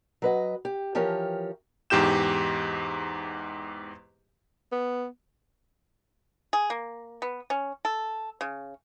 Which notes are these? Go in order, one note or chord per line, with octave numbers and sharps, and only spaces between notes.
F#3 B4 D#5
G4
E3 F3 G4 A#4 C#5 G#5
E2 G#2 G4 G6 E7
B3
G#4
A#3
B3
C#4
A4
C#3